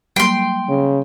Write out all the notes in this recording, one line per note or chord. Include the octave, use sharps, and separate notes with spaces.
F#3 G3 A#3 G5 C6
C#3